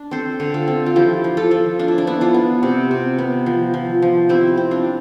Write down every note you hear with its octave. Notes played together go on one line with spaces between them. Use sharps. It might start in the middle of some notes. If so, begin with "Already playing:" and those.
Already playing: D4
C4 A4 C5
D3
F4 A4
C4
F4
F3 E4 G4
F3
F4 A4
F3
D4 F4
E4
D4
B3 E4
D4 F4
B3
C3
C3
B3
F3
F3
F3
C4 E4 G4
C4
D4 F4